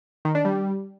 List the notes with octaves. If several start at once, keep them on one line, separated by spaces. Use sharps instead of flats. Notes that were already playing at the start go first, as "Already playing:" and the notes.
D#3
D4
G3